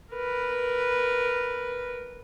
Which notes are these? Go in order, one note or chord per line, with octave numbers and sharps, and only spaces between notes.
A#4 B4